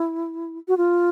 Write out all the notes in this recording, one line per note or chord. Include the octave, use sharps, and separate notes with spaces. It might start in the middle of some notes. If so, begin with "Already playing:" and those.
Already playing: E4
F#4
F4